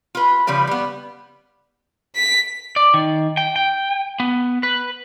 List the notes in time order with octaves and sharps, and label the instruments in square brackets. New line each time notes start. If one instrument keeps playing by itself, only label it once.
[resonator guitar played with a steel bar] F4 B4
C#3 F3 G3 B4
G3 B3
[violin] B6
[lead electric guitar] D5
D#3
G5
G5
B3
B4